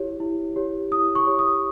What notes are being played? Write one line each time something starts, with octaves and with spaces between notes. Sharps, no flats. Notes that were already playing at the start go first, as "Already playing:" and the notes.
Already playing: E4 G4 C#5
E4
G4 C#5
E4 D#6
C#6
G4 C#5
D#6